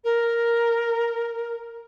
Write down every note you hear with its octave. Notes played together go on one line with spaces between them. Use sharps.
A#4